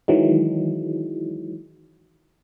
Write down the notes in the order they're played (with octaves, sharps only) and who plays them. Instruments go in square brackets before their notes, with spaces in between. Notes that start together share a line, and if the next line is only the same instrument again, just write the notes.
[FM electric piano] D#3 E3 F#3 G#3